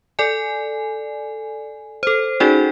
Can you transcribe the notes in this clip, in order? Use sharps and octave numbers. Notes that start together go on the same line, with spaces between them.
A4 D5 G#5
A4 C5
C#4 D#4 F#4 G#4 D5 G5